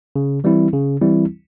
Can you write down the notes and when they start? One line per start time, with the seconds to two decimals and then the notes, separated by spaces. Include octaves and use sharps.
0.16 C#3
0.44 E3 G3 C4 E4
0.73 C#3
1.01 E3 G3 C4 E4